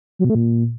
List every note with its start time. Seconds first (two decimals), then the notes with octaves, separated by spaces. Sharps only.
0.19 F#3
0.25 B2
0.30 A3
0.35 A#2